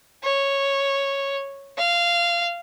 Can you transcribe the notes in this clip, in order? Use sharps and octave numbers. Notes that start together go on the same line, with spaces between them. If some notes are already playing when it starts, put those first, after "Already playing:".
C#5
F5